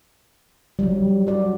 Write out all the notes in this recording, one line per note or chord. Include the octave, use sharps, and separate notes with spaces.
F#3 G3
F#4 D5